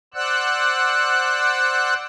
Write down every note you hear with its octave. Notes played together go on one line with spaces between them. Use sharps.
C5 D5 F#5 E6 F#6